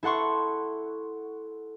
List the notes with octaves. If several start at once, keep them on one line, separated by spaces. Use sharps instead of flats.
E4 A4 F#5 C6 C#6